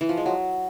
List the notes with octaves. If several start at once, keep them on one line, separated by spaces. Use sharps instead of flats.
E3
F3
G#3
F#3